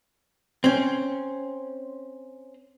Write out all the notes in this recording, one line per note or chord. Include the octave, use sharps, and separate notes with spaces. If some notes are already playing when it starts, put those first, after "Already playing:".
C4 C#4